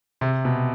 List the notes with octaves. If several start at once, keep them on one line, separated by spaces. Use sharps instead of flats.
C3
B2